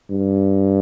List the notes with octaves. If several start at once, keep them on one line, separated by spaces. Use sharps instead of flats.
G2